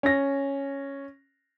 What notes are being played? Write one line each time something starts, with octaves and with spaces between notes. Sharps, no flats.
C#4 A#6